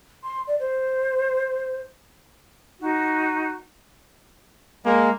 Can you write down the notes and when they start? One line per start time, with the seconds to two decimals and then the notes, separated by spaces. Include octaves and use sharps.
0.23 C6
0.47 D5
0.60 C5
2.80 D#4 F#4
4.85 G#3 A#3